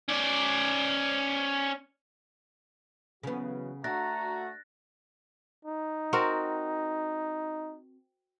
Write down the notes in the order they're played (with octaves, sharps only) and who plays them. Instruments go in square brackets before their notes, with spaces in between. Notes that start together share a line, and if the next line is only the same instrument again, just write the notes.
[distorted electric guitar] C#4 D5
[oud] C#3 B3 [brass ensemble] E3 F#3 F#4
[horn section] A3 F#4 [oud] D4 [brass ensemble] A#5 [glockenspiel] F#6 A6 A#6
[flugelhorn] D#4
[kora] C4 F#4 A#4